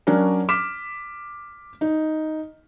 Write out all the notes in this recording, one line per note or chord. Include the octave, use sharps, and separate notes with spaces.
F#3 C#4 D4 A#4
D6 F6 B6 E7
D#4